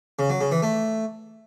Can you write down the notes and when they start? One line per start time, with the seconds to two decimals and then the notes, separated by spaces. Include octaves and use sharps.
0.19 C#3
0.30 F#3
0.41 C#3
0.52 E3
0.62 A3